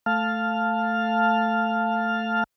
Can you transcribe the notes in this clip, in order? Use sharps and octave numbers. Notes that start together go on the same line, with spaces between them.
A3 F5 A5 F6